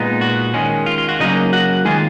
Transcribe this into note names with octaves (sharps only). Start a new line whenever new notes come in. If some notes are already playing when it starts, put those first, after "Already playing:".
Already playing: A#2 G#3 B3 D#4
F#4
D#3 G#3 C#4
F4
F4
F#4
C#3 F#3 A#3 D#4 D#5
F#4 F#5
D#3 G#3 A#3 F4 G#4